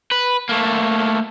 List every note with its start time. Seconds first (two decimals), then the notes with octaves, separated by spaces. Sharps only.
0.11 B4
0.49 A3 A#3